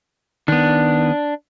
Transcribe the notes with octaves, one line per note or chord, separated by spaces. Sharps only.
D#3 B3 D4